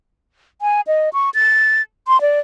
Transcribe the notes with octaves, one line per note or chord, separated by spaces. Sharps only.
G#5
D#5
C#6
A6
C6
D5